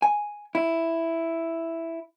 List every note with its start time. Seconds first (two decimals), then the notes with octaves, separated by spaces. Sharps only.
0.02 G#5
0.55 E4